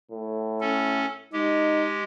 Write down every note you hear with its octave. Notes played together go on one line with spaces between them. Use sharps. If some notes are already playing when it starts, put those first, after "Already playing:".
A2
C#4 A4
G#3 D#4 G4